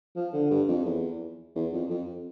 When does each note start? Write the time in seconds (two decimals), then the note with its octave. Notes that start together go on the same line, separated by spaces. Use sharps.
0.16 F3
0.33 D3
0.51 G2
0.68 F2
0.85 E2
1.55 E2
1.73 F2
1.90 F2